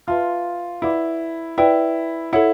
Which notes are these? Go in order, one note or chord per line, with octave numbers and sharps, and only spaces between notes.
F4 B4 E5 A5 C6 F6
E4 B4 D5 F#5 B5 D6
E4 B4 D5 G5
E4 A4 C#5 F#5